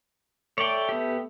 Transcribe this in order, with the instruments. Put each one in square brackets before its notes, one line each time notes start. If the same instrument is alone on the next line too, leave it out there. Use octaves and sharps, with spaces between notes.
[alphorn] A3 [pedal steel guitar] C#5 D5 G5
[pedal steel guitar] B3 G4